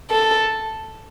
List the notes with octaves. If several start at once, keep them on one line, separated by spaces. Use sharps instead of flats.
A4